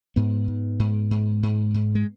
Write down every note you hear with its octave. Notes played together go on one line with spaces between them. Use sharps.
G#2 B3
G#2
G#2
G#2
G#2
G#2
G#3